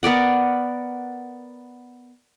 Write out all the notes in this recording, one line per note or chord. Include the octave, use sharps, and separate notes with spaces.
B3 A#4 D5 F#5